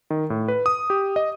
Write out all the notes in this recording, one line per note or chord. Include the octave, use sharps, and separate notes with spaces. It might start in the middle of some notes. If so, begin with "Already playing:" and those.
D#3
A2
B4
D#6
G4
D#5